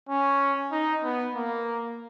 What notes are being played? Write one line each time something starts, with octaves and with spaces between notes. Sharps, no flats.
C#4
D#4
B3
A#3